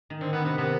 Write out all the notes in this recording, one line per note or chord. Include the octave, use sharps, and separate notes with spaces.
D#3
D3 C4
D#3 B3
C3 B3
C3 B3